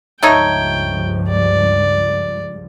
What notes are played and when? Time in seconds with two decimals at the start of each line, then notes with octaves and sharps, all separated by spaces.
0.23 C#2 G2 F3 A3 D#4 C#5 G5
1.29 D5